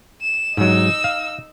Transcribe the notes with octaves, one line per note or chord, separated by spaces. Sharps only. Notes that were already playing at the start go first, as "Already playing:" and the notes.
E7
G#2 F#3 D#4 E6
F5